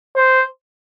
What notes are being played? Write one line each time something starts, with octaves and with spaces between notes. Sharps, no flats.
C5